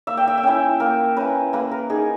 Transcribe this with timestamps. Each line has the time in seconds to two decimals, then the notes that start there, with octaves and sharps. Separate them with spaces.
0.07 A#3 E5
0.17 G5
0.28 E5
0.38 G5
0.43 C#4 E4 E5
0.80 A#3 A#4
1.17 C#4 E4 B4
1.53 A#3 B4
1.71 A#4
1.90 D#4 G#4